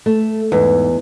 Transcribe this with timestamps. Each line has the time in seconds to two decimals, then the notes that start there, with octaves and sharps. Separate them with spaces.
0.06 A3
0.52 E2 G#2